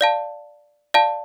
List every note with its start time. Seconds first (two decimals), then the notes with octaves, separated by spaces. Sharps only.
0.01 D5 F5 A5
0.94 D5 F5 A5